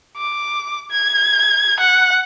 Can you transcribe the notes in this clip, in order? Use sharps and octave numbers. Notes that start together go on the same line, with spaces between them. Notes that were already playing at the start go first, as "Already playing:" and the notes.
D6
G#6
F#5